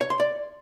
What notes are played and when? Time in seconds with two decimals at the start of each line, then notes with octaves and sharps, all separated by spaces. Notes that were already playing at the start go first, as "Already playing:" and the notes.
0.01 C#5
0.10 C6
0.20 D5